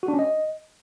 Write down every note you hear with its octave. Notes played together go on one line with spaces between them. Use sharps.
F#4
D4
C#4
D#5